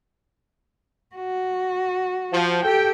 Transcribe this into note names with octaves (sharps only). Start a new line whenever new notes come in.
F#4
F3
G4 A4 G5